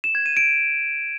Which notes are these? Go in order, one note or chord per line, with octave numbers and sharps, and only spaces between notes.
E7
G#6
D#7
D7